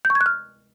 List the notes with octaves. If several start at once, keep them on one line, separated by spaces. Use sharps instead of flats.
G6
C#6
G#6
F#6
F6